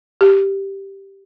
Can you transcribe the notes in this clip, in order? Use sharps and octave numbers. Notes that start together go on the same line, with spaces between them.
G4